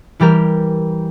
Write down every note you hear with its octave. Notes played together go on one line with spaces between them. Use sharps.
E3 G3 G4 A#4